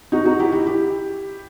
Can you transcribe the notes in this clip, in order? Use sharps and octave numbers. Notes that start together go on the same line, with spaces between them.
D#4 F#4
D#4 F#4
E4 G4
E4 G4
E4 G4